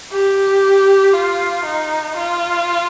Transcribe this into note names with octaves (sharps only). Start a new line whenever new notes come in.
G4
F4
D#4
F4